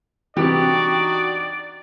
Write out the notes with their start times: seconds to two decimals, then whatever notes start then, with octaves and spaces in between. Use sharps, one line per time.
0.37 C3 E3 D4 D#4 F#4 G4 D5